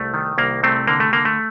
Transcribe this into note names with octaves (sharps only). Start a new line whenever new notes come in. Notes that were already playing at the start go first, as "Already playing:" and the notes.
Already playing: C2 A3
D#3
C2 A#3
C3 A3 C4
D3 A#3
A3
D3 A#3
A3